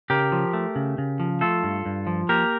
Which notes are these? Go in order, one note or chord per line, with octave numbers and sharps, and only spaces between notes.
C#3 G4 A#4
F3
A3
C#3
C#3
F3
A3 F4 A4
G2
G2
F3
A#3 G4 A#4